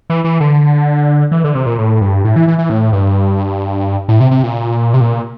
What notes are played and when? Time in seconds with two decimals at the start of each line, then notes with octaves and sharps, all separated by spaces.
0.10 E3
0.24 E3
0.40 D3
1.31 E3
1.44 D3
1.55 C3
1.66 A#2
1.78 A2
2.01 G2
2.24 A2
2.36 E3
2.48 E3
2.58 E3
2.70 A2
2.93 G2
4.09 A2
4.20 C3
4.31 C3
4.43 A#2
4.94 C3
5.01 A#2